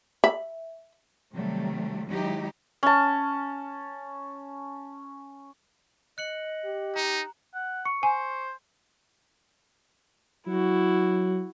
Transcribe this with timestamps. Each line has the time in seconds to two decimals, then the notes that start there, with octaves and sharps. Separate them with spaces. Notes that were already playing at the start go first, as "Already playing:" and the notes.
0.24 E5 B5
1.33 C3 D#3 F#3 G3 A3
2.08 D#3 F#3 G#3 D#4 E4 G4
2.83 C#4 A5
6.18 D#5 F#6 C#7 F#7
6.65 G4
6.96 D#4 A#5
7.54 F#5
7.85 C#6 C#7
8.03 C5 G#5
10.47 F#3 E4 F#4